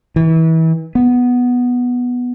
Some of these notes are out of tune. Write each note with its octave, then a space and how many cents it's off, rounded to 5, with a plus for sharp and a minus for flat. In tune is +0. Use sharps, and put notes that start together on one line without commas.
E3 -30
B3 -5